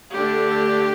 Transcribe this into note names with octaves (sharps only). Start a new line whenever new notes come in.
D3 A3 D4 G4